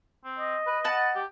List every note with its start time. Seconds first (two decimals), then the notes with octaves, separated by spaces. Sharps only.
0.25 C4
0.39 D#5
0.67 B4
0.85 B4 F#5 A5
1.15 G4